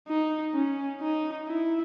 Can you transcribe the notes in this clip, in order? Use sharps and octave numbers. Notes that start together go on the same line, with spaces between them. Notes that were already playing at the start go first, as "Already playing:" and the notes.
D#4
C#4
D#4
E4